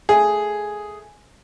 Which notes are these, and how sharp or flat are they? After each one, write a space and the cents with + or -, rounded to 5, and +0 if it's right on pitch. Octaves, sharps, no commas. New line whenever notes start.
A3 +0 G#4 +5